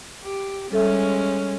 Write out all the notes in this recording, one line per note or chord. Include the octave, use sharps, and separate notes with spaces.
G4
G3 G#3 C#4 A4 E5